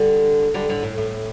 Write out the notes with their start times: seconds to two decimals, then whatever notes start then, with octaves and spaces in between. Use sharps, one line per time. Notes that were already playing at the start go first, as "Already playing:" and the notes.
Already playing: D3 G3
0.54 D3 G3
0.69 A2 D3
0.83 A2
0.98 A2